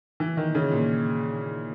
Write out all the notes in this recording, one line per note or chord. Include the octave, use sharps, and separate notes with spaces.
E3
D#3
C#3
A#2